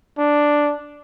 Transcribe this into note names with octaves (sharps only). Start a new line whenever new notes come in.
D4